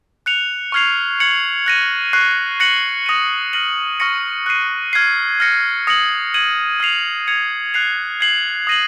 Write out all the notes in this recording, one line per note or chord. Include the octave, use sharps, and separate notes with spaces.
F#6 C#7 F7
C#6 F6 G#6 C7 F7
G#6 C#7 F#7
F#6 A#6 D#7
C#6 F#6 C7
F#6 A#6 C#7 F#7
D#6 A#6 D#7
F6 A#6 D#7 F#7
C#6 F6 A#6 C#7
F#6 C7 D#7
F6 G#6 C7
F6 A#6 C#7
D#6 A#6 C#7 F#7
G#6 D#7 F#7
F6 C7 F7
G#6 C#7 F7
F#6 C7 F7
G#6 C7 F#7
D#6 A#6 D#7 F#7